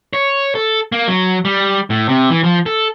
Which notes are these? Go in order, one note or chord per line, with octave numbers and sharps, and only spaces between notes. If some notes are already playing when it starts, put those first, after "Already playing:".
C#5
A4
A#3
F#3
G3
A2
C3
E3
F3
A4